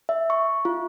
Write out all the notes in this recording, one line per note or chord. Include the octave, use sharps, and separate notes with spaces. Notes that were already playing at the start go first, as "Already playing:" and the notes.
E5
C#6
F4